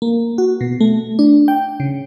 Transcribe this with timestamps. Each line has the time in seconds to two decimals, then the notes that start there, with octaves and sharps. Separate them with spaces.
0.02 A#3
0.38 F#4
0.61 B2
0.81 A3
1.19 D4
1.48 G5
1.80 C#3